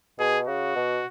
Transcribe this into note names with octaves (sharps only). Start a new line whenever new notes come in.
B2 G#4
C#3 F#4
B2